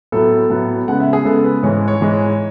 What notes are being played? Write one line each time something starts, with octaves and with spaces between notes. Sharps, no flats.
A2 F#3 B3 A4
A2 F#3 B3
C#3 G#3 B3 F#5
E5
G#4
C#3 G#3 B3 A4
B4
G#2 E3 G#3 C#5
C#5
G#2 E3 G#3